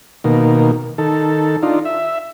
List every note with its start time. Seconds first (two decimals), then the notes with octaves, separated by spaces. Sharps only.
0.24 B2 D#3 A#3
0.98 D#3 A4
1.63 D4 D#4 F4
1.85 E5